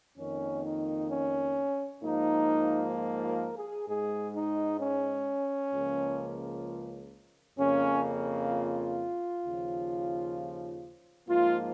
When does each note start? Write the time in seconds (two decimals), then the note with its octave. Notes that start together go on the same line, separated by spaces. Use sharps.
0.18 F2 D#3 A#3 C#4
0.64 D#4
1.11 C#4
2.03 G#2 F3 A#3 D#4
2.96 F4
3.26 A#4
3.57 G#4
3.88 G#2 G#3 G#4
4.35 D#4
4.80 C#4
5.73 C#2 C#3 F3 A#3
7.59 F2 C#3 A#3 C#4
8.51 F4
9.44 D#2 C#3 F3
11.29 G#2 F3 A#3 F4